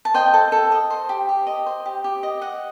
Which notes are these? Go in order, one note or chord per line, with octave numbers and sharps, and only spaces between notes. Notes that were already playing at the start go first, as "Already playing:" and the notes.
A5
C5 D#5 G5
A4
A4
D#5
C5
G4
G4
D#5
C5
G4
G4
D#5
D#5 F#5